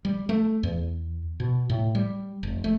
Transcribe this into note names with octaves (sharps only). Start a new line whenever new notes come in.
G3
A3
E2
B2
A2
G3
F1
A3